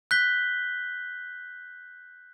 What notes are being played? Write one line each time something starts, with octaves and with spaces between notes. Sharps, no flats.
F#6 G6 B6 G7